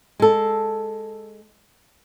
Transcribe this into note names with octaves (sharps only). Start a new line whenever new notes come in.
G#3 A4